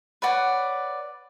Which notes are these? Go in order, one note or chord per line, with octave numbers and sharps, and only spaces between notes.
B4 C#5 D5 F#5